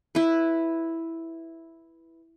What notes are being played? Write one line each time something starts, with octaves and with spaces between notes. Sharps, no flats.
E4 B4